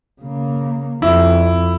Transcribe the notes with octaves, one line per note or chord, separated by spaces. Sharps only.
C#3 A#3
F2 E4